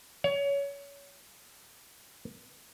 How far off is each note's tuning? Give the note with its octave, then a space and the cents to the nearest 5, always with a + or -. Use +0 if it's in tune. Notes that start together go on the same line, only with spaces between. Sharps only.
C#5 +25